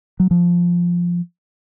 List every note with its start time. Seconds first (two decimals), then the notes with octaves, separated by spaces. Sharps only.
0.20 F#3
0.31 F3